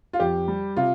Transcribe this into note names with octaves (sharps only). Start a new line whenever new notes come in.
F4
F2 G4
G3
C3 F4